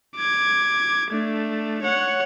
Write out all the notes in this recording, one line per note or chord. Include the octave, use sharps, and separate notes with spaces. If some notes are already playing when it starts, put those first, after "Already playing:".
D6 G#6
A3 D4
C#5 F#5